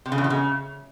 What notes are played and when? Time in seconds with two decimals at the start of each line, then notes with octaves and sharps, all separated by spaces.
0.06 C3
0.12 C#3
0.18 E2
0.24 B2
0.30 C#3